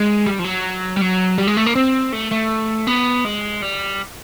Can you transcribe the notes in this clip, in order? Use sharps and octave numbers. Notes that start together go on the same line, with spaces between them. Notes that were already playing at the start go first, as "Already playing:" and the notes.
Already playing: G#3
G3
F3
F#3
G3
F#3
G3
G#3
A3
A#3
C4
A3
A3
B3
G#3
G3